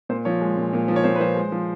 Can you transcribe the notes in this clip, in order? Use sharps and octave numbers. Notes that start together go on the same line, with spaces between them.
A#2 C5
F3 C#5
G#3
A#2
A#2
F3
C#5
A#2 C5
B4
F3 C5
G#3
F3